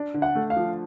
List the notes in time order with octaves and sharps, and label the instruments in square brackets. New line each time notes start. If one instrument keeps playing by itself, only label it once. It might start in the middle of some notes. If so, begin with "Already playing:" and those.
Already playing: [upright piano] D4
D3
[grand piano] F#5
[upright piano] A3
[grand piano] F5
[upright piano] F3